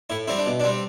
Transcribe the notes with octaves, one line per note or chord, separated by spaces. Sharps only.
A2 E4
G3 C4 E4
D4
B2
D4
G3 C4